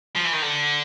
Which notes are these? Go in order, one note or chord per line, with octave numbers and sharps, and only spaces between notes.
F3
E3
D#3
D3